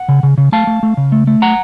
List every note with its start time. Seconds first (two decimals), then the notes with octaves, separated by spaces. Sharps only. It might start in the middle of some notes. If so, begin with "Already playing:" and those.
Already playing: F#5
0.08 C#3
0.23 C#3
0.38 C#3
0.52 A3 F5 A5
0.67 A3
0.83 A3
0.97 C#3
1.12 A3
1.27 A3
1.42 F#5 A#5